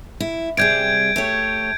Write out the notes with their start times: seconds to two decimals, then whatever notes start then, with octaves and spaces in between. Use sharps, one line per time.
0.20 E4
0.57 C3 G3 G#4 G6 G#6 D7
1.16 A3 G4 C#5